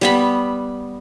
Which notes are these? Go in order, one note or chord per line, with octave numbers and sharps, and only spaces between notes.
G3 B3 B5